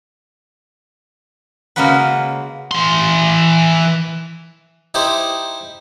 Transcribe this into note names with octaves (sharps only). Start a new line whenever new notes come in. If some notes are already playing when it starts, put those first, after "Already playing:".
C#3 G#3 A#3 C#4 F#4 B4
E3 C6
D#4 E4 G4 C5